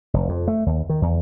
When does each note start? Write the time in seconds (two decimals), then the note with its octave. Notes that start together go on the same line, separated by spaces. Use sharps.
0.14 F1
0.29 F2
0.47 A3
0.66 D#2
0.89 D#3
1.02 E2